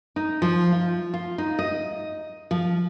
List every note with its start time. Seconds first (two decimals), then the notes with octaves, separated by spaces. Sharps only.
0.16 D#4
0.42 F3
0.72 F4
1.14 F4
1.38 D#4
1.59 D#5
2.51 F3